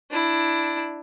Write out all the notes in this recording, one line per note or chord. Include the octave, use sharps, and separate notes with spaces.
D4 E4